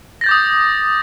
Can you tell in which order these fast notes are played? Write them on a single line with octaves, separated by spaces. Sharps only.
A#6 A6 G6 D6 D#6